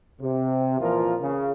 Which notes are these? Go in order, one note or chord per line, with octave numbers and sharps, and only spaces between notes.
C3
A#2 E3 F3 F4 A#4
C#3